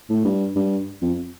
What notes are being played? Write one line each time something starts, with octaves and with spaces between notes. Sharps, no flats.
A2
G2
G2
F2